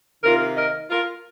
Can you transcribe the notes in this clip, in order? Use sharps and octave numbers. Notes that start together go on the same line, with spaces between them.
C3 D#3 A#3 F4 A#4
A#4 D#5
F4 A#4